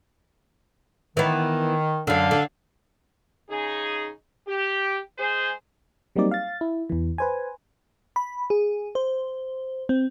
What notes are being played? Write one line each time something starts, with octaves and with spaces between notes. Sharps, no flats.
D#3 E3 B3
F#2 D3 D4 F5
D3
C#3 D#4 G#4
G4
G#3 G#4 C5
F#3 G3 A#3 C4 D#4 D5
F5 A6
E4
E2 E3
B4 C5 G#5
B5
G#4
C5
C4